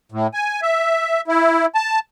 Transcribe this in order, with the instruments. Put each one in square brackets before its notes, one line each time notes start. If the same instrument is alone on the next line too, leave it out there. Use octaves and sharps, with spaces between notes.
[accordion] A2
G#5
E5
E4
A5